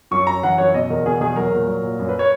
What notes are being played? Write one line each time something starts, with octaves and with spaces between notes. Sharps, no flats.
F#2 C#6
F#2 A#5
E3 F#5
F#2 C#5
B2 D#5
E2 A#4
B2 G#4
E2 G#4
F#3 A#4
A#2
F#3
A#2
F#2
B4
C#5